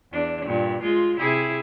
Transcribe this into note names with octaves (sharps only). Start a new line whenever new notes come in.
E2 D4
G2 A#2
G#3 F4
C3 E4 G#4